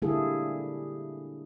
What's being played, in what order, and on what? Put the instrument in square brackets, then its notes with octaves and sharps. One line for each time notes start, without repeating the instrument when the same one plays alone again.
[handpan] D3 G3 A#3 E4 G#4 A4